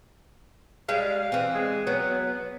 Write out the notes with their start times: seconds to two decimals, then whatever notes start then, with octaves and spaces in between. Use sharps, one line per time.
0.89 G3 G#3 F5
1.32 E3 C4
1.55 G#3
1.87 F#3 B3
2.26 B3